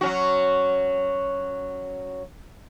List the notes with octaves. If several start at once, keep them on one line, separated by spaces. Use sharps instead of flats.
F#3 C#4 F#4